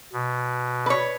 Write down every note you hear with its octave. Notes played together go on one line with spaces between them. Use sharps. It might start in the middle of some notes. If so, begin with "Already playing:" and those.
B2
B4 C#5